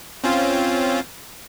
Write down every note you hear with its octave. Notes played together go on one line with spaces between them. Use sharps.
C4 C#4 F4